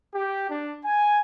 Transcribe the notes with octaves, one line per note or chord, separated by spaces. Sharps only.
G4
D4
G#5